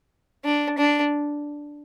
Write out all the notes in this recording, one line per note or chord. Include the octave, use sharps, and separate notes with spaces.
D4
D4